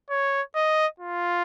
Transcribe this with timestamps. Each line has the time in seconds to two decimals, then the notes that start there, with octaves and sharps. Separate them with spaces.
0.10 C#5
0.55 D#5
1.00 F4